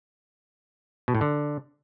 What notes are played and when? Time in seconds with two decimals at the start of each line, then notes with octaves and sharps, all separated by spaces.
1.08 B2
1.15 A2
1.21 D3